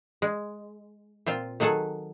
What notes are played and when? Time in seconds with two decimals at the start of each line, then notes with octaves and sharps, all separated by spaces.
0.22 G#3
1.26 A#2 C4 F4
1.60 D#3 F#3 G#4 A4 F#5